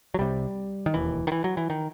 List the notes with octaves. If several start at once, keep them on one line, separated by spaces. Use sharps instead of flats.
F#3
C2 C3 G3
D#3
E1 D#2 E3
D#3
E3
F#3
E3
D#3